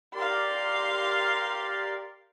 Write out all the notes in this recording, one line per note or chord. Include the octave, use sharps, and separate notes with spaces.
G4 A#4 D5 F5 C6